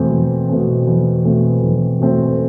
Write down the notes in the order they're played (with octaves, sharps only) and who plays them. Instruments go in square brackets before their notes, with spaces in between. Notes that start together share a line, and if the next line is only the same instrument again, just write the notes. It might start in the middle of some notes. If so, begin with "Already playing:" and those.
Already playing: [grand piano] E2 B2 A3 C4
E2
B2 A3 C4
E2
B2 A3 C4
E2
B2 A3 C4